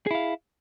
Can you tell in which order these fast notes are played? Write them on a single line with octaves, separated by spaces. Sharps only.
G#4 E4 F5